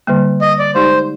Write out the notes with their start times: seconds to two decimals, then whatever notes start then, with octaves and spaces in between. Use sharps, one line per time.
0.07 D3 G3 A#3
0.41 D#5
0.59 D5
0.75 G#3 D#4 G4 C5 D5